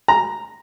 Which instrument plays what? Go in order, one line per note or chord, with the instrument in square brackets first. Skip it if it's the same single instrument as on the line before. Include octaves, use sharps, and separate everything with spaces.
[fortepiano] A#5